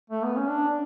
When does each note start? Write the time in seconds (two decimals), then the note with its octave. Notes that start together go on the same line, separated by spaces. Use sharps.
0.10 A3
0.24 B3
0.36 C#4
0.49 D4